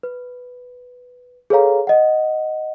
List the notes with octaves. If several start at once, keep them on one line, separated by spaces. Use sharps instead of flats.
B4
G#4 A4 B4 C#5 F5 A#5
D#5 F#5